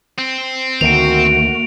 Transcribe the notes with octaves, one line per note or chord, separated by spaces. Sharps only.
C4
D2 D#3 A3 A#3 F#4 D7 F7